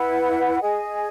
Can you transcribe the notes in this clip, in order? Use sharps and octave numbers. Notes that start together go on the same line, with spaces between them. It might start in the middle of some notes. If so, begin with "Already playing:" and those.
Already playing: E4 B4 F#5
G#4 D#5 G#5